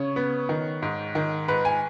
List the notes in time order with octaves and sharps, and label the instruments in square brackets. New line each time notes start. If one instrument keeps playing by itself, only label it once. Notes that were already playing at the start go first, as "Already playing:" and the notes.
Already playing: [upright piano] C#3 C#5
B3
D#3
G#2
D#3
G#2 B4
G#5